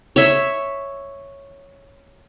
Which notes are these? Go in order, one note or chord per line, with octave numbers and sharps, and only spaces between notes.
C#5 E5